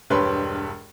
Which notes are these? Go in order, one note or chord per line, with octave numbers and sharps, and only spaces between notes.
E1 G2 G4 B4 C#5 C6